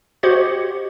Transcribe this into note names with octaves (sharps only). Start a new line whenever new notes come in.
F#4 G4 C5 D#5 G#6 C#7